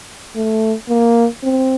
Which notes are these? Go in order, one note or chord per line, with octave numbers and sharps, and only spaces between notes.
A3
A#3
C4